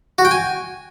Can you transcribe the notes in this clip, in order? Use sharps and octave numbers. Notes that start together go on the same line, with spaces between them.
F#4
G5
G#5